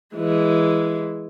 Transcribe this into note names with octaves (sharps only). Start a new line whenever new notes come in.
E3 G#3